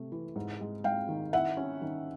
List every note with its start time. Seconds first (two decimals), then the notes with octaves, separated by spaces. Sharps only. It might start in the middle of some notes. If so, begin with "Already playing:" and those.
Already playing: C3 A3
0.12 E3
0.36 G#2
0.60 G#3
0.84 G#2 F5 G5
1.09 D#3
1.33 E4 E5 F#5
1.57 C#4
1.82 D#3